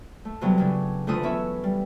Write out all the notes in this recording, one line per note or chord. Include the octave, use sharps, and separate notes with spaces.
A3
C3 E3 F#3 G3 B3
C#3 B3 C#4 D4
D2 E3 A3 F4 B4 D#6
B3 C#4 E4 C#5 E5
G3